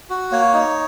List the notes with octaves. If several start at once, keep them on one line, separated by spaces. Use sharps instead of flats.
F#4
A#3 C#5
D#4